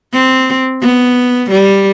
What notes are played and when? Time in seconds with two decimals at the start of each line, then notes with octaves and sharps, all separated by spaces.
0.14 C4
0.82 B3
1.51 G3